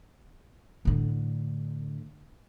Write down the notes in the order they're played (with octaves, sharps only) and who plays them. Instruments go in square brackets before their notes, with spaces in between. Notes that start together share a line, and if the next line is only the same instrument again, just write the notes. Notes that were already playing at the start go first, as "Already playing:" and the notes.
[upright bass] A2 D3